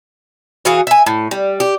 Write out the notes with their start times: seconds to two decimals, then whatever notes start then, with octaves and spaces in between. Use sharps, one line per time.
0.65 E3 F#4 G#4 F5
0.87 E5 G#5
1.06 A2
1.31 G3
1.60 G4